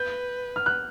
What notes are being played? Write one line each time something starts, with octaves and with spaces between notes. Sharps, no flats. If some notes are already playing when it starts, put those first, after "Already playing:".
Already playing: B4 G6
F6
F#6